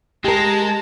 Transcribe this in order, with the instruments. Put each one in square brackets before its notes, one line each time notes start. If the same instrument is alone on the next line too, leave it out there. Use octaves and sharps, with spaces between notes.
[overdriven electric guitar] G#3 [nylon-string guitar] G4 A#4 [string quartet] A5 A#5